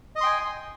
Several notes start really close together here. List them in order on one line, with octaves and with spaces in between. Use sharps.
D#5 D#6 C6 G5 G#5